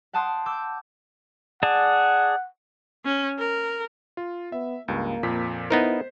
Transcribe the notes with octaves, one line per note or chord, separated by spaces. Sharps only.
F#5 G5 A5 C6 D#6
D6 E6 G6
G#4 D5 F#5 A5
C#4
A#4
F4
B3 E5
C#2 G2 A#3
F2 A#2 B6
B3 D#4 E4 A#4 C5